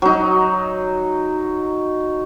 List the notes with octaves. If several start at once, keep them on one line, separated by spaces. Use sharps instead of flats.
F#3 D#4